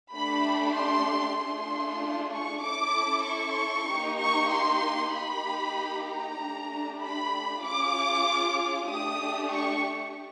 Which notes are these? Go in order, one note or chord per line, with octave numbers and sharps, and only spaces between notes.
A3 D4 G4 B5
C6
A3 D4 F4 G#4 C6
C#6
C#4 E4 A4 D6
C#6
A#3 D#4 G4
C#6
C6
A#3 D#4 G4 B5
A#5
A3 D4 G4
B5
C#4 F4 G#4 D6
A3 D4 G4 D#6
C#6